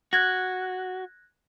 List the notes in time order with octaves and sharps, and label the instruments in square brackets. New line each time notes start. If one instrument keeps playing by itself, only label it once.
[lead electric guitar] F#4 [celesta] F#6 G#6 A#6